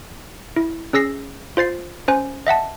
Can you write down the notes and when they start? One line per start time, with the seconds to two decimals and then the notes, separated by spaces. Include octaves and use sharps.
0.56 E4
0.93 C#4 G#4 E6 A#6 C7
1.57 F4 C5 A6 C7
2.08 C#4 C5 G#5
2.47 D#5 E5 F#5 A5